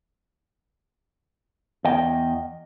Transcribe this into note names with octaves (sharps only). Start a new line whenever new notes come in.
E2 D#5 G5